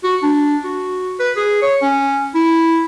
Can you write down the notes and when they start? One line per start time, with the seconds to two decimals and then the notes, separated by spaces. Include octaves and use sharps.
0.04 F#4
0.23 D4
0.64 F#4
1.20 B4
1.37 G#4
1.62 C#5
1.82 C#4
2.35 E4